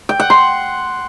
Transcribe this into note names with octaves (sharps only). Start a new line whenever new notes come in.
G5
F#5
C6